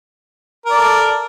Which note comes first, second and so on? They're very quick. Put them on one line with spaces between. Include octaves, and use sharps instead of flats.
A#4 D5 A4